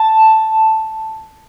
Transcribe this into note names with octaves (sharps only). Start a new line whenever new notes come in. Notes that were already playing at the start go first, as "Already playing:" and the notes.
Already playing: A5